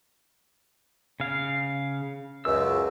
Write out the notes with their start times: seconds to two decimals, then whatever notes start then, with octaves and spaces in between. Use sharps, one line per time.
1.20 C#3 F5
2.45 C#2 F#2 E6